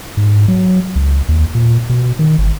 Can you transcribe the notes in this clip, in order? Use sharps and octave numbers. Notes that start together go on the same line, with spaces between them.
G#2
F#3
C#2
D#2
A#2
B2
D#3
G1